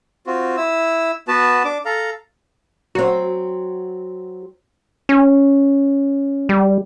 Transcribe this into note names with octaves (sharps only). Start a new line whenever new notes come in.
C4 F4 F#4
E4 E6
B3 F#4 B4 A5
D4 D6
A4 F5 A#5
F#3 C4 F#4
C#4
G3